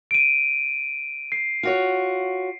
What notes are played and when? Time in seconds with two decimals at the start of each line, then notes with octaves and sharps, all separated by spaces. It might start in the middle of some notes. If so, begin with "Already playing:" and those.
0.11 D7 D#7
1.32 C7
1.63 F4 F#4 C#5